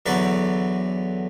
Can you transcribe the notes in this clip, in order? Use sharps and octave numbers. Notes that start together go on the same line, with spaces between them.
E2 D3 F#3 B4 D5